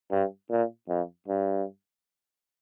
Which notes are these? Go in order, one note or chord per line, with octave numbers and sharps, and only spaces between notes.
G2
A#2
F2
G2